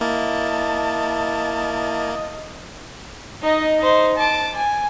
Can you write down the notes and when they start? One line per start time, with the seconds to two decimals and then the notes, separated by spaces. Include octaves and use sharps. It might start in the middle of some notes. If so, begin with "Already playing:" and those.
0.01 A#3 E4 D#5 A5
3.42 D#4 D#5
3.79 D#4 C5
4.17 A5 D6
4.55 G#5